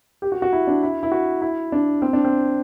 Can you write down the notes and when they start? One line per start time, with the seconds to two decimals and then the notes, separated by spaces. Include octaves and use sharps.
0.22 G4
0.32 F#4
0.42 F#4
0.53 E4
0.67 D4
0.83 E4
1.03 E4
1.12 F#4
1.42 E4
1.72 D4
2.02 C4
2.13 D4
2.25 C4